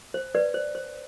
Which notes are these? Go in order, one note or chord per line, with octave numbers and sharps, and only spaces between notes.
C5
B4 D5
C5
C5